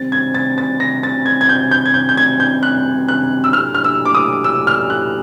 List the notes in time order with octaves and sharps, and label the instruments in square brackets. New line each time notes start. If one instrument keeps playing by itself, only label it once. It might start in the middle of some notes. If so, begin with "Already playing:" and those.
Already playing: [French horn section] C3 D#3 G3 C4 [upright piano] A6
[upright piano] G#6
A6
A6
A#6
A6
G#6
G#6
G6
G6
G#6
G6
G6
G#6
G6
F#6
F#6
E6
[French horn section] A2 F#3 A#3 D4 G4 [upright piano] F6
[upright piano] F6
E6
D6
D#6
E6
F6
F#6